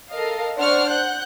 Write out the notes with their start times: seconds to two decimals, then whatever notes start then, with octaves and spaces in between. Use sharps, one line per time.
0.11 A4 A#4 D#5 F5
0.57 D4 C5 D5 F#5 C#6 F6
0.90 F#5 F#6 G6